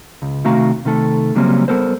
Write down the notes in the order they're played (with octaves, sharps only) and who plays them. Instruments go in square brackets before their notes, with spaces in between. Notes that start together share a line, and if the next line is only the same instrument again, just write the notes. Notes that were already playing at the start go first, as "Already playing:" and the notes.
[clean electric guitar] C#2
C3 D#3 A3 F#4 F5 A#5
C3 D#3 A3 A4
C#3 F#3 G3 A#3 C4 C#4
G3 B3 A4 A#4 C5